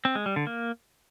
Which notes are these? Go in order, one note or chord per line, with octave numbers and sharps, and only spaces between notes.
C4
G#3
G3
D3
A#3